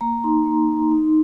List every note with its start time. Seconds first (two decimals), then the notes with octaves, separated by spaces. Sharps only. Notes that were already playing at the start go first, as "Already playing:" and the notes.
0.01 A#3 A#5
0.24 D#4 C6
0.45 A#3
0.69 D#4
0.91 D#4